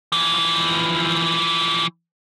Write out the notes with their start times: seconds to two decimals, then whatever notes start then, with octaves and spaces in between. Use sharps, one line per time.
0.13 E3 F3